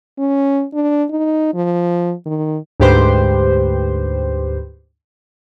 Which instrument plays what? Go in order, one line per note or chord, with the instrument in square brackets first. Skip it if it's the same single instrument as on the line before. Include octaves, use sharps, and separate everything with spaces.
[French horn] C#4
D4
D#4
F3
D#3
[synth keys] D2 G#2 G4 B4 C5